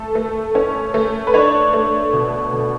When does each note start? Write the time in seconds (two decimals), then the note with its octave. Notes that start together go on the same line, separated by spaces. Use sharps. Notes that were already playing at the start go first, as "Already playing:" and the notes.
Already playing: A3 A4
0.15 A3
0.55 C#4
0.94 A3
1.27 B4
1.34 D4 C#5
1.73 A3
2.13 B2
2.53 B2